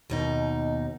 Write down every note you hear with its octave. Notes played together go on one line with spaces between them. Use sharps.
D#2 B2 D#4